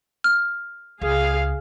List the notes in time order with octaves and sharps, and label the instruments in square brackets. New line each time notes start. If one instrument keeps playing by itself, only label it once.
[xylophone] F6
[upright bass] C#2 [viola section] G#4 F5